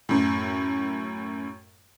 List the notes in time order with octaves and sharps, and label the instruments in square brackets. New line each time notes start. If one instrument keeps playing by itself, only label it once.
[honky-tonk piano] F#2 A2